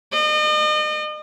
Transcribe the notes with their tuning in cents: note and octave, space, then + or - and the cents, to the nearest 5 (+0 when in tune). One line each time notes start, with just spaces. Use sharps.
D#5 -40